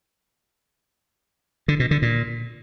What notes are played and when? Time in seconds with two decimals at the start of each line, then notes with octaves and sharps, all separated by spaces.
1.68 D3
1.80 B2
1.91 D3
2.02 A#2